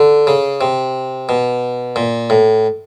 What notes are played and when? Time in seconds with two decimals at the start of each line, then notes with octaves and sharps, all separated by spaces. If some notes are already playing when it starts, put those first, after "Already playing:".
Already playing: D3
0.27 C#3
0.61 C3
1.29 B2
1.96 A#2
2.30 A2